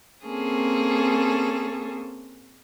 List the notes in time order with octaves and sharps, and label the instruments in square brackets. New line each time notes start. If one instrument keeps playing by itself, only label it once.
[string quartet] A#3 C4 C#4 G#4 A4